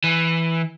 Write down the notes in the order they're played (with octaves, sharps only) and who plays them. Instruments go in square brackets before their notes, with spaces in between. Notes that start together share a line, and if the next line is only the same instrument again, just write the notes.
[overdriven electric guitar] E3